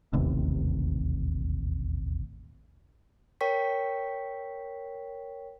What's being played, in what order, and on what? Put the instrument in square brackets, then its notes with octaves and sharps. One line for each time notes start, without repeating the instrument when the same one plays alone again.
[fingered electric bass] E1 A1 D#2 C3
[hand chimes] A#4 C#5 G5 C#6 B6